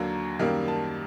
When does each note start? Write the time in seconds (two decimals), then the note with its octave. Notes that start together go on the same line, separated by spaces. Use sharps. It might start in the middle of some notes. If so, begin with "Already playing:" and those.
Already playing: D#2 D3 F#3 A#3 A#5
0.39 F#2 D#3 G3 A#3
0.68 A5